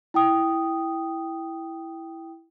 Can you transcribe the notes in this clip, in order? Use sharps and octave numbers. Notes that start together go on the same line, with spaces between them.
E4 G5 D#6